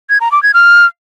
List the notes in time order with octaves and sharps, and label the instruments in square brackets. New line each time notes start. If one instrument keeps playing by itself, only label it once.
[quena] G#6
A#5
D6
G#6
F6